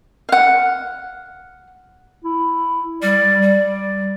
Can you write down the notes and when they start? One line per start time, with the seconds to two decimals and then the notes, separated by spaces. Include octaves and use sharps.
0.29 F5 F#5
2.24 E4
3.02 G3 D5
3.42 G3